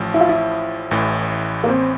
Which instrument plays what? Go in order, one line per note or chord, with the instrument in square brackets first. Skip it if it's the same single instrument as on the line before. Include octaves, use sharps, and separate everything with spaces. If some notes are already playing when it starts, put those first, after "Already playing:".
Already playing: [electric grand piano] A1 A2 F3
[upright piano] E4
F4
E4
[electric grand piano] A1 A2 E3
[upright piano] A#3
C4